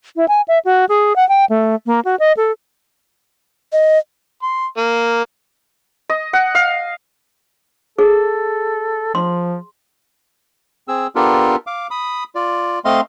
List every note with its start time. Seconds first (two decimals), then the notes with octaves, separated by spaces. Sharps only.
0.16 E4
0.28 G#5
0.48 E5
0.65 F#4
0.89 G#4
1.16 F#5
1.29 G5
1.49 A3
1.86 A#3
2.05 F#4
2.19 D#5
2.37 A4
3.73 D#5
4.43 C6
4.77 A#3
6.10 D#5
6.33 F#5
6.55 F5
7.99 G#4 A4
9.15 F3 C6
10.88 C4 G#4 E6
11.15 B3 D4 F4 G4 A4 A#4
11.67 F5 D6
11.91 B5 D#6
12.35 F4 D5
12.85 A3 C4 D#5 F5 C6